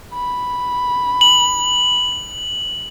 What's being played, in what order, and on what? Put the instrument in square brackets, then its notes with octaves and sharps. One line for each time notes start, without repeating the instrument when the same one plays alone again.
[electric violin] B5
[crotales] F#7